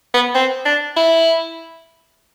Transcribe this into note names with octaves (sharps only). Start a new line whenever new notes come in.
B3
C4
D4
E4